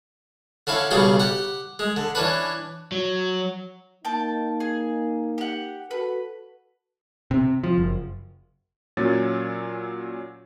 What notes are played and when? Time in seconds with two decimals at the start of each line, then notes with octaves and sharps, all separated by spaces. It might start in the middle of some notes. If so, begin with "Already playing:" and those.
0.67 D3 C#4 E4 F5
0.91 B1 C#3 G3 C#4 F5 G5
1.20 G4 F#5
1.79 G#3
1.96 D3
2.15 E3 C#4 D4 B4
2.92 F#3
4.05 A#3 D#4 G5 A5
4.60 G#4
5.38 G4 F#5
5.91 F#4 A4 B4
7.31 C3
7.64 F3
7.78 F#1
8.97 A#2 F#3 C#4 A6